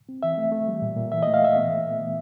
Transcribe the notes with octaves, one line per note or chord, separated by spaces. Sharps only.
C4
E3 E5
A3
A3
G3
A#2
A#2
E3 E5
A3 D#5
F5
A3 E5
B3
A#2
A#2
E3